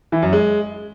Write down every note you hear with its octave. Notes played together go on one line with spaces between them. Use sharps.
E3
F#2
G#3